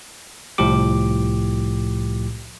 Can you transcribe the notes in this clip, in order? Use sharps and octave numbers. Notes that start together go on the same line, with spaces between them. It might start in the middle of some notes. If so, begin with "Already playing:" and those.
C2 A2 F3 G4 D6